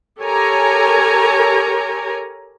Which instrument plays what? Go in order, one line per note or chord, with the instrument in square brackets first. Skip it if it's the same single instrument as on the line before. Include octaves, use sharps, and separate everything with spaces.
[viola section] G4 A4 A#4 C#5 G#5 A#5